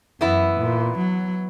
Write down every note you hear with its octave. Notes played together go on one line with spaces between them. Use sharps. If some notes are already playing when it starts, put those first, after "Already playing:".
F#2 E3 B3 E4
A#2
F#3